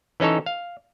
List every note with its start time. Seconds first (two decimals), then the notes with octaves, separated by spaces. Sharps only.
0.20 E3 C#4 D#4 A4 C#5
0.46 F5